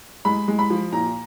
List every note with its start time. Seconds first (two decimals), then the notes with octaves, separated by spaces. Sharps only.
0.25 G#3 B5
0.48 G#3
0.59 B5
0.70 F3
0.92 A#2 A#5